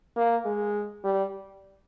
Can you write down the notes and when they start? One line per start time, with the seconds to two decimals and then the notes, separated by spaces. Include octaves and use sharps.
0.16 A#3
0.45 G#3
1.04 G3